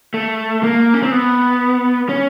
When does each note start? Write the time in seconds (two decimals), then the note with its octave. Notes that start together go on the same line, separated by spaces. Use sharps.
0.14 A3
0.63 A#3
0.94 C#4
1.03 C4
1.12 B3
2.09 C#4